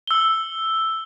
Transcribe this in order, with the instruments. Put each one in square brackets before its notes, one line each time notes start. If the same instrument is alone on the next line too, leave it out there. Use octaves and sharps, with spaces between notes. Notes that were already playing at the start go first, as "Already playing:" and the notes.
[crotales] E6 G7